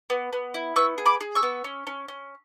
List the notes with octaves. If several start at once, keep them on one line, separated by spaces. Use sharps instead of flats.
B3
B3
E4
B3 C#6 E6
G#4
B5 D6
G#4
C#6 E6
B3
C#4
C#4
C#4